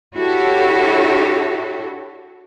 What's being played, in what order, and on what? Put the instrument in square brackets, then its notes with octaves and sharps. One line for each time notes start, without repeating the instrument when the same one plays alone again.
[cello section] D4 E4 F#4 G4 A4 C#5